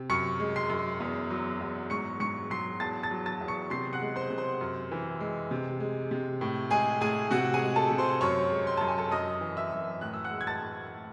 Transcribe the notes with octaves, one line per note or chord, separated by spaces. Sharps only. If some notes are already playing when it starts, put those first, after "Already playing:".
Already playing: C3
F#2 C#6 C#7
G#3
C6 C7
F#2
E2
F#3
E2
G#2 C#6 C#7
G#2 C#6 C#7
F#3 C6 C7
E2 A5 A6
A5 A6
F#3
A5 A6
E2
C#6 C#7
C3 C6 C7
F#5 F#6
G#3
C5 C6
C3
C5 C6
F#2
E3
G#3
C3
G#3
C3
A2
G#3 G#4 G#5
A2 G#4 G#5
C3 F#4 F#5
G#4 G#5
G#3
A4 A5
C3
C5 C6
F#2 C#5 C#6
G#3
C6
F#2 A5
G#5
A4 A5
F#2 D#5 D#6
E3
E5 E6
F#2
A2 F#6
E6
F#5 F#6
G#3
G#6
A5 A6
A2